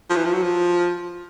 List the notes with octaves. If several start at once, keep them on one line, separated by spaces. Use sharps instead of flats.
F3
E3
F3
F#3
F3